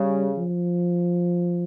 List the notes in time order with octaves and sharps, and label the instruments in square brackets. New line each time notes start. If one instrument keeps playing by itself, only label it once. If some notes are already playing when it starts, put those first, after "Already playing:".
Already playing: [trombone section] C#3 [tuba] G3
[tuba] F3